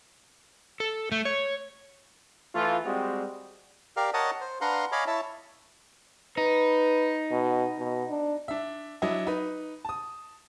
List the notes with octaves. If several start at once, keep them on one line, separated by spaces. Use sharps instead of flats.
A4
A3
C#5
E3 A3 F4
G3 G#3 C4 F#4 G4
G4 A#4 D5 F5
A#4 C#5 D#5 F#5 A5 D#6
C5
D4 B4 F5 F#5 A#5 C6
C#5 D#5 F5 G#5 B5 D6
E4 C#5 E5 A5
D#4 B4
B2
B2
D4
D4 E5
F#3 D4 E4 D#5
D#4 B4
A5 D#6